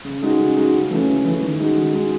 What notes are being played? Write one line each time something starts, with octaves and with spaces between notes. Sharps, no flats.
C#3
G#3 D#4 F#4
C#3
G#3 D#4 F#4
C#3
E3 A3 C#4
C#3
E3 A3 C#4
D#3
G#3 D#4 F#4
D#3
G#3 D#4 F#4